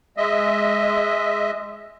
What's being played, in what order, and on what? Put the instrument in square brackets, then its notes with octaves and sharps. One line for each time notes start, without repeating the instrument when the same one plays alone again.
[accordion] G#3 D#5 E5